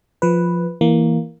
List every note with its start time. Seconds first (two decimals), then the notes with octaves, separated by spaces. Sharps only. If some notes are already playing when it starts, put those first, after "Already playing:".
0.22 F3 B4
0.81 E3 A#3